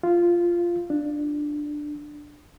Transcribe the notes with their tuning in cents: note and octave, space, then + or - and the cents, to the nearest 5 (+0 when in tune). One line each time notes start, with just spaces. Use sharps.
F4 -10
D4 +10